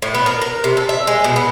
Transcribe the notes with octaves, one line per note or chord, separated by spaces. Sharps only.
A2
B3
A#4
A#4
C3
A4
E5
G#3
B2
B3